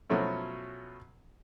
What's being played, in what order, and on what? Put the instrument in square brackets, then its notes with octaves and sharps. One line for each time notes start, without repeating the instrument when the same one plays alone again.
[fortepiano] B2 F3 F#3 A3 C#4 E4